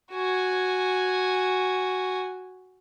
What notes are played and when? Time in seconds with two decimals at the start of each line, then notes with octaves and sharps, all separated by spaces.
0.12 F#4 G#5